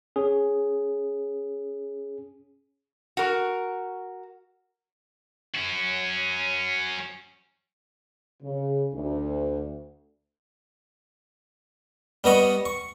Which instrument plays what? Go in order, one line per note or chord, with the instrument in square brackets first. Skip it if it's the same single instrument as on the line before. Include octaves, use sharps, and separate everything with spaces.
[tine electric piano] C#4 G#4
[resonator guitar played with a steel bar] F#4 A#4
[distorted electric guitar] C#4 F#4
[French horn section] C#3
D2
[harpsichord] G3 B3 D#5 C#6
C#6